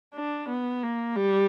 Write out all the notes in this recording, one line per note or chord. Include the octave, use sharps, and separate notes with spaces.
D4
B3
A#3
G3